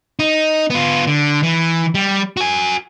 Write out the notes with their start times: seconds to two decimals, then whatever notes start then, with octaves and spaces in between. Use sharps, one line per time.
0.19 D#4
0.70 B3 F4
1.07 D3
1.43 E3
1.95 G3
2.37 F#4 G#5